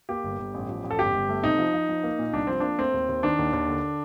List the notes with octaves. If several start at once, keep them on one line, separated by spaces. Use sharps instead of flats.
A#3 G4
G1
G1
A1
F3
A1
A4
G1 G4
G1
A3
C3 D#4
F3
F3
F3
A#3
A#2
C2 D4
F3 C4
A#3 D4
A3 C4
D#2
D#2
D#3 D4
D#2
D#2
D3